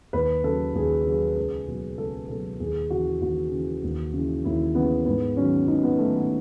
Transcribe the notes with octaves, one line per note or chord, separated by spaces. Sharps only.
D#2 B4
C#3 F#3 A4
D#2 G#4
C#3 F#3 G#4
C#2
B2 F#3
C#2 A4
B2 F#3 A4
D#2 G#4
C#3 E3 F#4
D#2 F#4
C#3 E3
D#2
C#3 E3
D#2 E4
C#3 E3 B3
G#2 B3
D#3 F#3 C#4
G#2 D#4
B3
D#3 F#3 A3
B3